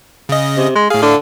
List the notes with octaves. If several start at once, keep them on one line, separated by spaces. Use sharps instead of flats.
C#3 D#5
C3
G#3
A2 G#4 F5
D3